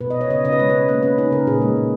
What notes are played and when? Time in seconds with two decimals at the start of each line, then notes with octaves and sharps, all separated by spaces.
0.01 B2 B4
0.10 D#5
0.16 B2
0.21 C#5
0.30 C#3 D#5
0.45 C#3 D#5
0.52 B4
0.59 G#3 C#5
0.70 C#4 B4
0.88 A#3 B4
1.03 C#4 B4
1.18 D#4 B4
1.32 C#3 A#4
1.47 A#2 G#4
1.62 G#3
1.77 A#2